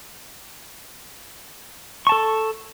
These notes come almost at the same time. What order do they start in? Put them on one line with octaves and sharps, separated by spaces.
C#6 A5 A4